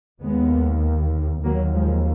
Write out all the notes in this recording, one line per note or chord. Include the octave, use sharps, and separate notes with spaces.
D#2 G#3 B3
D#2 F#3 A#3
F3 G#3